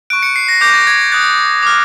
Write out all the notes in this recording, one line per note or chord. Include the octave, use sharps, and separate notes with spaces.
C#6 F#6 D7
C#7
C7
A#6
D6 G6 A#6
A6
G#6
D#6 F#6 A6
D6 F6